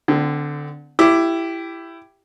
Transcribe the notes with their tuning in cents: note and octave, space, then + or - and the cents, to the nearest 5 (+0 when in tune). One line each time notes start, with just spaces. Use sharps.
D3 +0 C4 -40
E4 +15 G4 +0 D6 +0